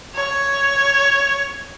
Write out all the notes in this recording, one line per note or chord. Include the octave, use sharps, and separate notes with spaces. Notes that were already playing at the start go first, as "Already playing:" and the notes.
C#5